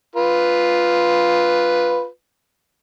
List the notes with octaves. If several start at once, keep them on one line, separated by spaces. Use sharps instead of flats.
F4 B4